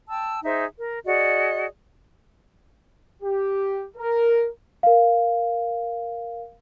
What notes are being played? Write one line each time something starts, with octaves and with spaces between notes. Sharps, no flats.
G5 A5 E6
D#4 G#4 C5 E5
A#4
F#4 G#4 D5 D#5
G4
A#4
A#4 F5